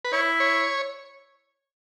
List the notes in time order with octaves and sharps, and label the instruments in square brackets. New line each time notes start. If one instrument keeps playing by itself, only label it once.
[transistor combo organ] B4
[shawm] E4 [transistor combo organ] C#5
[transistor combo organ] C#5